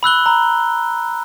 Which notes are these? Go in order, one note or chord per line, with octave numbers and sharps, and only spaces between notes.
B5 E6 F#6 G7
A#5 B5